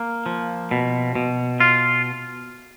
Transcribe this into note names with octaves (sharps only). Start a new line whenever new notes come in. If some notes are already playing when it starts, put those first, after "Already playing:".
Already playing: A#3
F3
B2
B2
F4